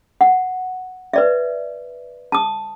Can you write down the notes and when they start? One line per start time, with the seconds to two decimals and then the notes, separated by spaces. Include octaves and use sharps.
0.21 F#5
1.13 B4 D5 E5
2.32 A5 D#6